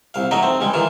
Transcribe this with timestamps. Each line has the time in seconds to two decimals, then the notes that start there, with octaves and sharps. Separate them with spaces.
0.14 C2 F5
0.31 F#3 A3 D#4 D#5
0.43 C4
0.61 C#2 G3 G#3
0.73 D#3 E3 F4